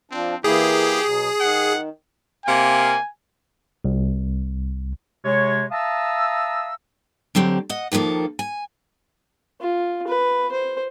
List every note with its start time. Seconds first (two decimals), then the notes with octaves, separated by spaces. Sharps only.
0.11 F3 C4 D4
0.44 E3 A#3 E4 G4 G#4
1.05 B2 F#3
1.40 D#3 F#5
2.46 C3 A#3 G#5
3.84 C2
5.24 C3 G#3 C#5
5.72 E5 F5 A5 A#5 D#6 E6
7.35 D3 F#3 C4 G4
7.69 D#5 F#5
7.92 D#2 D#3 F3 A#3 A4
8.39 G#5
9.61 F4
10.07 B4
10.52 C5